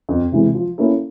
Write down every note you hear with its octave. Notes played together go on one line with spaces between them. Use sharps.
F2
C3 E3 G#3
F3
A#3 C#4 E4 A4